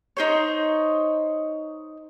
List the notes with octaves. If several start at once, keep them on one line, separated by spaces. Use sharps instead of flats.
D#4 C5 C#5